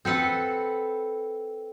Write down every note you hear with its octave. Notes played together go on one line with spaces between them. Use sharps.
C4 A4 B4 F#5